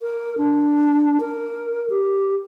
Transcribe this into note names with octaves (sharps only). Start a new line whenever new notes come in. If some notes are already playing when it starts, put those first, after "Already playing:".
A#4
D4
A#4
G4